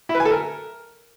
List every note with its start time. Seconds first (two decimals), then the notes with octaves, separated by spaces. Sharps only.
0.09 E4
0.15 B4
0.20 G#5
0.25 A4
0.31 A#4